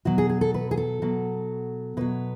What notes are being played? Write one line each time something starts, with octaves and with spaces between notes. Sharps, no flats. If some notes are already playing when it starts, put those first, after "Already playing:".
B2 F#3 F#4
G#4
G#4
A4
B4
G#4
A4
B2 F#3
B2 F#3 B4